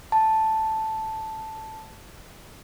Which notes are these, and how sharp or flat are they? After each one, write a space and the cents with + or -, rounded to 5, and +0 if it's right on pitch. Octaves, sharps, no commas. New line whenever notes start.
A5 +0